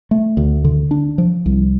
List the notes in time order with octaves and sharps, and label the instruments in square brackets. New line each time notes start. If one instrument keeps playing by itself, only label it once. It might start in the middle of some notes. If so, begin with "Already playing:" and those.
[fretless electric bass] A3
D2
D3
D4
F3
C2